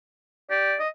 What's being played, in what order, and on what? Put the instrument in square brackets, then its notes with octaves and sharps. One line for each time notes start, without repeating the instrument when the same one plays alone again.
[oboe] G4 [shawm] D5
[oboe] D#5